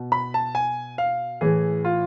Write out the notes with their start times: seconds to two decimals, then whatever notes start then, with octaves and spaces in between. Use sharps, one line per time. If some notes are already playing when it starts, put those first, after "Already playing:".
Already playing: B2
0.12 B5
0.34 A5
0.55 G#5
0.98 F5
1.41 A2 E3 G#4
1.85 F4